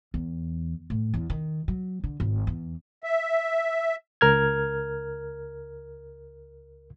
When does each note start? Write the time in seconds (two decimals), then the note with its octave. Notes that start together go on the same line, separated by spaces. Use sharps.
0.14 E2
0.90 A2
1.14 E2
1.30 D#3
1.68 F#3
2.04 D3
2.20 G#1
2.47 E2
3.04 E5
4.21 C#2 A#4 F6 G#6